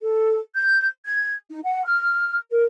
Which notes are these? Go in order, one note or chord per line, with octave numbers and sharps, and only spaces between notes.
A4
G6
G#6
D#4
F#5
F6
A#4